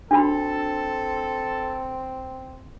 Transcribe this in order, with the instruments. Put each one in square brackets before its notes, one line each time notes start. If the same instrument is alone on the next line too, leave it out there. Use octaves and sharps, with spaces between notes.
[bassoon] C4 [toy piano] D4 F#4 B5 [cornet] A4